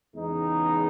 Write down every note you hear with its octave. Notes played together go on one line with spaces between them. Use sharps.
E2 C#3 G#3 B3 D#4